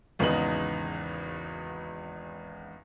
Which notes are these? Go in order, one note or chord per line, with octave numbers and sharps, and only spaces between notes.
G#1 E2 C#3 B3 D#4 F#7